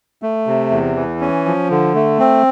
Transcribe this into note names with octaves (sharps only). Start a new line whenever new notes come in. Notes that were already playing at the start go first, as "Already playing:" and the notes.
A3
C3
E2
E3
C#4
F3
D3
A3
C4